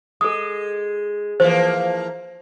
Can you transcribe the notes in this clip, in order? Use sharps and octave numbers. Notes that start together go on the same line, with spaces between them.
G#3 A4 D#6
E3 F3 A#3 C5